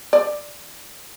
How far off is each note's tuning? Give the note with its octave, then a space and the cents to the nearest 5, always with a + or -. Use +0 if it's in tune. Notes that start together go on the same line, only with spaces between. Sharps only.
D5 +5